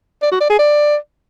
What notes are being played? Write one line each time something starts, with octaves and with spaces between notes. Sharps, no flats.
D5
F#4
D5
G#4
D5